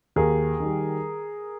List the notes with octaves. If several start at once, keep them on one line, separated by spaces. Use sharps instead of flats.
D#2 G#4 A#4
D#3 G3